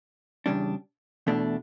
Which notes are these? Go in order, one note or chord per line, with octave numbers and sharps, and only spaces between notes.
E2 C#3 G3 D4
E2 B2 A3 D4